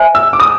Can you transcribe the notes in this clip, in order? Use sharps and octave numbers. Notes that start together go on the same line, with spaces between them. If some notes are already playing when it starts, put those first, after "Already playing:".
Already playing: C5 E5 G#5
E6
D6
D#6